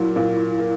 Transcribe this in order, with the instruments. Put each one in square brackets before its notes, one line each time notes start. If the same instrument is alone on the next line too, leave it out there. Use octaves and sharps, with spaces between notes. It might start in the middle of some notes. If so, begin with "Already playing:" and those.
Already playing: [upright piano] A#2 F#3 A#3 [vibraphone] E4
[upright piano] A#2
A#3